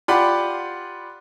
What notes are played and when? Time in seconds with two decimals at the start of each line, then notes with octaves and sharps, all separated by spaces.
0.08 F4 G4 D5 F#5 B5 C6